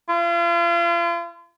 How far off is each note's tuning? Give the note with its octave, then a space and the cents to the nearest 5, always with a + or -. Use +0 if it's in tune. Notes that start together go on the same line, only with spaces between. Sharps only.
F4 -40